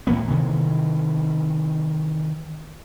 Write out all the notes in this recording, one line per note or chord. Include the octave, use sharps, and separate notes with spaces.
A2 E3 A#3 B3
C3 D#3 E3